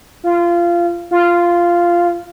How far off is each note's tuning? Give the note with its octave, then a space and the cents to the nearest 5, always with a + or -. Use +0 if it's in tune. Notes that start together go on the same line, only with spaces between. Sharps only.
F4 -20
F4 -10